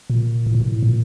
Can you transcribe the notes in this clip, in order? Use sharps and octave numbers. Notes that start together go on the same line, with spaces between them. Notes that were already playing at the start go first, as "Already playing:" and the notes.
A#2
A2
A#2
A2
A#2